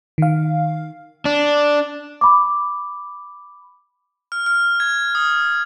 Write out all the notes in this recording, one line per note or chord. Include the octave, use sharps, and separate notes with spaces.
D#3 F5
D4
B5 D6
F6
F6
G#6
D#6